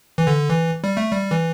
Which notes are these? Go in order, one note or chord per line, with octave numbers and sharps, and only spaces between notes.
E3
D3
E3
G3
A3
G3
E3